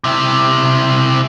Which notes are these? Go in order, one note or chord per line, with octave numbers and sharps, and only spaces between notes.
C3 E4